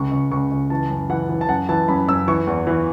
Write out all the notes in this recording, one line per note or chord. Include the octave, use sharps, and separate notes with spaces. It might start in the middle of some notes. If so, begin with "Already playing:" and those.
Already playing: C#2 C#6
C#2
C#2 C#6
C#2
E3 A5
F#2
E3 F#5
E3
A5
F#2 F#5
E3 A5
F#2 B5
F#2 E6
E3 C#6
E2
E3